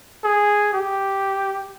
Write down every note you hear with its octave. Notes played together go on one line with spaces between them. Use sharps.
G#4
G4